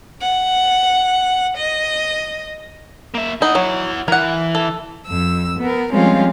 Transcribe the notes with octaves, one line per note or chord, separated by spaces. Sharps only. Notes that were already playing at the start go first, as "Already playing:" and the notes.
F#5
D#5
A#3 E5
D#4 E4 F#5
F#3
E3 A#4 F#5
A4
F2 E6
B3 A#4
F3 G3 G#3 C4 C#4 F4